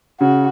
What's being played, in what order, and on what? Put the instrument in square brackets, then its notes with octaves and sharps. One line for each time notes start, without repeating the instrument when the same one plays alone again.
[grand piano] C#3 [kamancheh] F#4